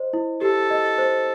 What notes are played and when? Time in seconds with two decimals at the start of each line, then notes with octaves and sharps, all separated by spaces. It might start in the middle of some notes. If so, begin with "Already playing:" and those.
Already playing: C5 D#5
0.13 E4
0.41 G4 A4
0.71 D#5
0.98 C5